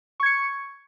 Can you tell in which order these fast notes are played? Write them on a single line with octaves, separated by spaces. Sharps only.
C#6 G#6 C#7